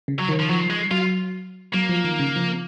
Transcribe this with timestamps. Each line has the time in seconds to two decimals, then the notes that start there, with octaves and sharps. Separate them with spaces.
0.08 C#3
0.19 F#3
0.29 D#3
0.39 F3
0.50 F3 F#3
0.70 G#3
0.91 F#3 F4
1.74 F#3 A#3
1.89 F3
2.04 D#3
2.19 C#3
2.36 F3